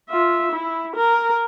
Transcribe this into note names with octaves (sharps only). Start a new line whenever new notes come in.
F4 E5
E4
A#4